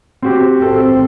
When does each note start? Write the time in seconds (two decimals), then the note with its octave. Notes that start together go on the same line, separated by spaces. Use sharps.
0.22 C4 F#4 G4
0.62 C4 A4